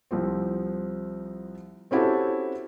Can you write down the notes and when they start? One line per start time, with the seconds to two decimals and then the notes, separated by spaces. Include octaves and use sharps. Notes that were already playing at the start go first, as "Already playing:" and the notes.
0.11 C2 F3 C4
1.91 C4 C#4 E4 F#4 G4 A4